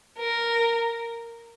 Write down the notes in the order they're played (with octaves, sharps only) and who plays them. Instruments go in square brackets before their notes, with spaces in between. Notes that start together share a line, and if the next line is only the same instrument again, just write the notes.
[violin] A#4